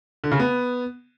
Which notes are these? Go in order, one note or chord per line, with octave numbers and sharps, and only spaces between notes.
D3
C#3
B3